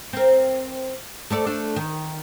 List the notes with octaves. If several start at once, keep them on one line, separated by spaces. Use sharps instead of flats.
C4 A#4
A3 A4 D5
A3 D4 A4
D#3